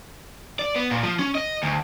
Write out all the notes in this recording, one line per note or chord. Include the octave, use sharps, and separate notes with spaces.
D5
B3
A#2
F3
C#4
D#5
D2